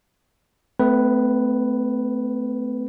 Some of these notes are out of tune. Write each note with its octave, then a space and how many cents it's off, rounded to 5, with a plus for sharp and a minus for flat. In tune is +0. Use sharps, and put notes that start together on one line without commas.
A3 +0 C4 -45 B4 +0